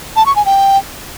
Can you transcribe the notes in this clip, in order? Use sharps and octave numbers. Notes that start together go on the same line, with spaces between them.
A5
C#6
G#5
G5